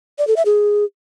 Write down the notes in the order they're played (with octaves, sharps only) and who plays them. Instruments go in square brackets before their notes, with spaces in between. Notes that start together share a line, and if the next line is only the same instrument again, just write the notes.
[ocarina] D5
A4
E5
G#4